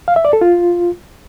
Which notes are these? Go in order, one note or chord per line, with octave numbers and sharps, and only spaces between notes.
F5
E5
D5
A4
F4